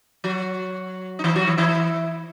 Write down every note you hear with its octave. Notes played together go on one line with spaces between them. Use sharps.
F#3 F#4
D#4
E3 E4
F#3 F#4
E3 E4
E3 E4